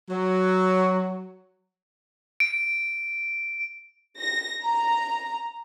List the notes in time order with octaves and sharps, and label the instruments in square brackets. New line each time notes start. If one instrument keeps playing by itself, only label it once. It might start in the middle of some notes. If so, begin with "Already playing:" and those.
[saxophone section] F#3
[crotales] D7
[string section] A#6
A#5